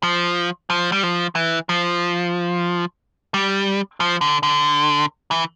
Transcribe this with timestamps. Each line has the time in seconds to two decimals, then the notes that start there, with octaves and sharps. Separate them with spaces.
0.03 F3
0.70 F3
0.92 G3
1.03 F3
1.35 E3
1.69 F3
3.34 G3
4.00 F3
4.21 D3
4.43 D3
5.31 E3